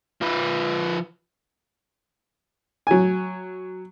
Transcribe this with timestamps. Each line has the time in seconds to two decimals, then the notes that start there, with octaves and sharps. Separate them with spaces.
0.21 F3 B4
2.87 F#3 G#5